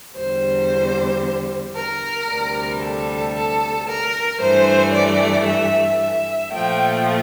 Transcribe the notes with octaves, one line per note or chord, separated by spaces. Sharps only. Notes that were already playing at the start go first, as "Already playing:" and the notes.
E2 D3 G3 C5
A#4
D2 C3 G3
A4
A4
A#4
G2 E3 A3 C5
D5
E5
E5
A#2 F3 A3 G5